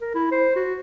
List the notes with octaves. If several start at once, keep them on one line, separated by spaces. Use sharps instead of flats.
A#4
E4
C5
F#4